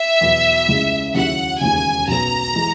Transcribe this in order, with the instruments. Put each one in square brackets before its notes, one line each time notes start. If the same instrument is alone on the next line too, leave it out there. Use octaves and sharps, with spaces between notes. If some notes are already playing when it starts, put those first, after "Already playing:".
Already playing: [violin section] E5
[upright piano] E2 B2 F#3 B3
C#2 C#3 G#3 C#4 E4
[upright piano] D#2 C#3 F#3 C#4 E4 [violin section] F#5
[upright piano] E1 D#2 C#3 [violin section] G#5
[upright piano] B1 B2 F#3 B3 [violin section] A#5
[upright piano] E3 G#3